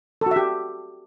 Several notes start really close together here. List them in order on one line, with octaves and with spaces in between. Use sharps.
A4 F#4 E5 G4